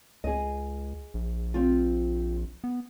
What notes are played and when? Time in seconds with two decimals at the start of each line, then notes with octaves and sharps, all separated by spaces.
0.24 C#2 G#4 D#5
1.14 A#1
1.54 C4 F4
2.64 B3